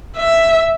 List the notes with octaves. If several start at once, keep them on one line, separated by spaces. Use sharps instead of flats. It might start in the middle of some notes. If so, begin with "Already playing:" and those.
E5